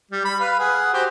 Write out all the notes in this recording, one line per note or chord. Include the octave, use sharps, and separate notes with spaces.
G3
B5
B4 F5
G#4 F#5
F#4 G4 C5